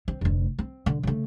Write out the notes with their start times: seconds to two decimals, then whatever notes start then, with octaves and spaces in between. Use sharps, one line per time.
0.08 C4
0.21 F1 D2
0.59 C4
0.86 D3
1.03 C#3 A3